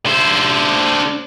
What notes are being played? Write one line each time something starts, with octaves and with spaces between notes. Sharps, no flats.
D3 C5